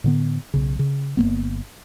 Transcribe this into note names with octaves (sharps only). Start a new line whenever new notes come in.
A2 D3 B3
B1 C#3
C#3
G1 G#2 A#3 B3